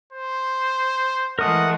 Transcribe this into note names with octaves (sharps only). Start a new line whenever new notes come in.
C5
E3 G#3 A3 A#4 F#5 D#6